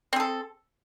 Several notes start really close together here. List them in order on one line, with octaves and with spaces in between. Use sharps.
C4 G#4 A4